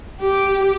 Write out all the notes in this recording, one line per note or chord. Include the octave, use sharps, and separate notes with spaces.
G4